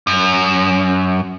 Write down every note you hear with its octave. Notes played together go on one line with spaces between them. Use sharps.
F#2